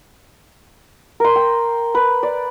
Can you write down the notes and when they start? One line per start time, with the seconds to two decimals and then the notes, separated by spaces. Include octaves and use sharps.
1.20 A#4 C6
1.36 G5
1.95 B4
2.23 D5